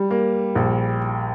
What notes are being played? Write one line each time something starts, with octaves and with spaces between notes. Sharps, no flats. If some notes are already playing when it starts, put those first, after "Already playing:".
Already playing: G3
A#3
A#1